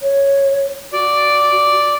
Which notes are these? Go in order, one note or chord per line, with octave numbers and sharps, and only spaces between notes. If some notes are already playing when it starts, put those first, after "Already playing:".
C#5
F#4 D5